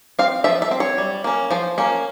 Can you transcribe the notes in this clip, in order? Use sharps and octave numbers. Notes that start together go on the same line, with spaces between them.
C4 F5
F3 E5
E5
C4
C#5
G3
A#3 C#4
F3 C5
A#3 C#4